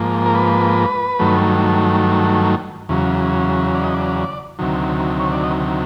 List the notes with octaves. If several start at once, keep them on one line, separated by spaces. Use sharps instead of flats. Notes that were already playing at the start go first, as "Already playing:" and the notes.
Already playing: G#2 F3 A#3
A#4
B4
G2 D#3 F#3 A3
E2 C#3 F#3
D5
D#5
D5
D2 C3 D#3 F#3
C#5
D5
D#5